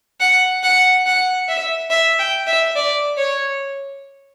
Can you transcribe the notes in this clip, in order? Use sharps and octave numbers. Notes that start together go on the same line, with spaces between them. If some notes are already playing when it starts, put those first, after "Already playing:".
F#5
F#5
F#5
E5
E5
G5
E5
D5
C#5